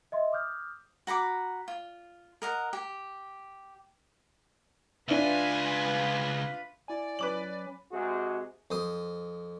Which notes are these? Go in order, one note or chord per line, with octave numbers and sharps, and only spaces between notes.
D#5 E5 C6
D6 D#6 F6 G6
F#4 A#5 B5 D6
F4
A#4 D#5 F#5
G4
C#2 D4 F4 B4 E5 G#5
E4 D5 G#5
F#3 C#4 B4 D6 F#7
C3 G#3 F#4 G#4
F2 C5 D#6